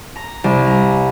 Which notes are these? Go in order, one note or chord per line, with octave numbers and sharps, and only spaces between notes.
A#5
C2
A#5